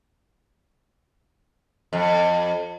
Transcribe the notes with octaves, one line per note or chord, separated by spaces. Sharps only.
F2